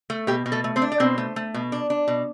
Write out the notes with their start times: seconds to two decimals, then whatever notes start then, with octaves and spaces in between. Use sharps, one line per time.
0.10 A3
0.27 B2 G4
0.46 B2
0.52 A3 A4
0.64 A3
0.76 C4 C5
0.82 D4
0.92 D5
1.00 B2 C4 C5
1.18 A3
1.36 A3
1.54 B2
1.72 D4
1.90 D4
2.08 B2